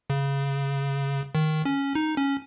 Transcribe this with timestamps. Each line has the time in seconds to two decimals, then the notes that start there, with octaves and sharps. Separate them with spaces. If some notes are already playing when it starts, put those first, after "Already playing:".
0.10 C#3
1.35 D#3
1.65 C#4
1.95 D#4
2.17 C#4